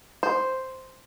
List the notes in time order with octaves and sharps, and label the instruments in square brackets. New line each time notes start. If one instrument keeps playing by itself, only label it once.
[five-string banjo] C5